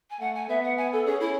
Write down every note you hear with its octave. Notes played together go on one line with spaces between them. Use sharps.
G#5
A3 F#5
G#5
B3 E5
F#5
G#5
A4
C#4 G#4
E4